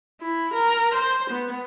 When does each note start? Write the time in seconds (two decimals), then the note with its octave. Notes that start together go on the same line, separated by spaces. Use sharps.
0.21 E4
0.53 A#4
0.94 C5
1.30 B3